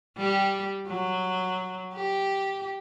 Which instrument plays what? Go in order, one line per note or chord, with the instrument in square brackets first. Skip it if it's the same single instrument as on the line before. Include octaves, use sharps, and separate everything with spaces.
[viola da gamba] G3 G4
F#3
G4